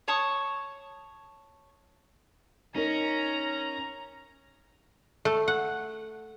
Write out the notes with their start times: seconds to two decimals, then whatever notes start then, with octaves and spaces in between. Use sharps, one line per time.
0.08 C#5 A5 C#6 D#6
2.75 C#4 D#4 A#4 A#5 A#6
5.25 A3
5.48 F#5